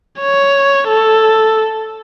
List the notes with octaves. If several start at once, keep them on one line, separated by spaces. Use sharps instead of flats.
C#5
A4